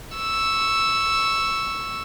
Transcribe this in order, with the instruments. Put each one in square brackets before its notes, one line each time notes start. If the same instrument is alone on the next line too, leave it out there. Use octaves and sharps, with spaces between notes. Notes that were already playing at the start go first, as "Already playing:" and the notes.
[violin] C#6 E6